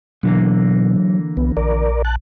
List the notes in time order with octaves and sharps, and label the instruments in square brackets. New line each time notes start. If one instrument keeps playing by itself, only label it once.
[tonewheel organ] B2 [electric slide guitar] D3 E3 A#3 [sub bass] F#3
[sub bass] C2 [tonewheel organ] B3
[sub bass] A#1 [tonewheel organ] A#4 D5
[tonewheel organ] A5 F#6